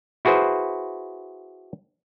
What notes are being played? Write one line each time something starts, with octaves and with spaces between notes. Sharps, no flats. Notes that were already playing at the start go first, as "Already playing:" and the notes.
E4 F#4 G#4 B4 C5